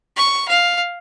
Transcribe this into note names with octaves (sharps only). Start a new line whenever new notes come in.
C#6
F5